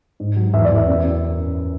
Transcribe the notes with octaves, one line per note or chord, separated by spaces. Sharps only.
G#2
F#3
E2 E5
D5
E2
E5
F#2
F#2